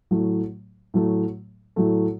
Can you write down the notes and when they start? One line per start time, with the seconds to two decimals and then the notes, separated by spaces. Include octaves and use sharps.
0.11 A2 F#3 A3
0.94 A2 F#3 A3
1.76 A2 F#3 A3